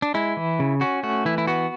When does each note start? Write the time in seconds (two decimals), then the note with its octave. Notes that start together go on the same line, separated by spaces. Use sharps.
0.02 D4
0.14 G#3 E4
0.37 E3
0.59 C#3
0.81 C#4 F#4
1.03 A3 F#4
1.25 E3 E4
1.38 E4
1.47 B3 F#4